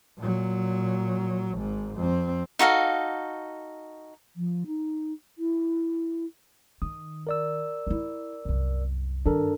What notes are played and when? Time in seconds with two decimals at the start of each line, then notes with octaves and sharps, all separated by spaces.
0.19 A#2 F#3
1.55 G#1 G#2
1.96 F2 C4
2.59 D#4 F#4 A4 F5
4.36 F3
4.66 D#4
5.38 E4
6.82 D#3 D#6
7.27 A#4 D5 E6
7.87 D#4 E4
8.45 C2 F#2
9.26 G2 D#3 D4 A4 A#4